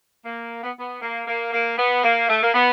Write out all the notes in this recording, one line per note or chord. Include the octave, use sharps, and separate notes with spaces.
A#3
B3
B3
A#3
A#3
A#3
B3
A#3
A3
A#3
B3